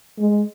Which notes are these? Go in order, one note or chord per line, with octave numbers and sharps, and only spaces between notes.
G#3